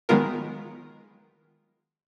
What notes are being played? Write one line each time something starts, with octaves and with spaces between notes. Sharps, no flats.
D#3 F#3 G#3 B3 F4 A#4